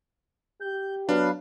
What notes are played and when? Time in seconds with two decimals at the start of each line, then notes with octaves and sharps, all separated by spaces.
0.61 G4 G6
1.09 F#3 B3 D4 B4 F5